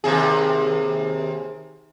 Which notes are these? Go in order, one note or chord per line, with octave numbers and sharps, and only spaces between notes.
D#2 C3 G#4